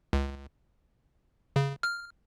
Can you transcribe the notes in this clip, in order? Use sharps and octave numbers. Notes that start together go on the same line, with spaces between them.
C#2
C#3
F6